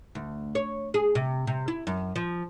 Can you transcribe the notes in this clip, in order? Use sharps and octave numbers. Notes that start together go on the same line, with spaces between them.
D2
C#5
G#4
C3
C3
E4
F#2
F3